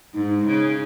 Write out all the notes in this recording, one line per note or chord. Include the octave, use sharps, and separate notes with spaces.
G#2 D#4
D#4
D#4
C#3